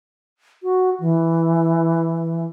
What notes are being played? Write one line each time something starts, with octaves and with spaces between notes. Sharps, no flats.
F#4
E3